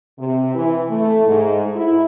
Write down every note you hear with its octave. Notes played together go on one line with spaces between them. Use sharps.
C3
E3
A3
G#2
E4